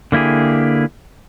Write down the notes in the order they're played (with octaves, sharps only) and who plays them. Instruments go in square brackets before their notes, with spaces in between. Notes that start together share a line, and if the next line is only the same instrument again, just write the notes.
[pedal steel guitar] D3 A#3 E4 G4 G#4